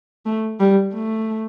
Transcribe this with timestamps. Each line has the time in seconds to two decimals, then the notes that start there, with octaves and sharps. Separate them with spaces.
0.26 A3
0.60 G3
0.94 A3